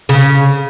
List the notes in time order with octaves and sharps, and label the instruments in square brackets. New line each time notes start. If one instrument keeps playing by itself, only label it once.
[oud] C#3